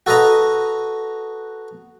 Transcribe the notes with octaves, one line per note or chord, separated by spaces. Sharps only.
F#4 A4 B4 D#5 A#5